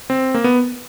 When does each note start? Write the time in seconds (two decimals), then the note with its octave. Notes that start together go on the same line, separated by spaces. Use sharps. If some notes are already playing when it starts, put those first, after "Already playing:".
0.10 C4
0.34 A#3
0.44 B3